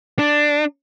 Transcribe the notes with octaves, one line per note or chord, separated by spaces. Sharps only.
D4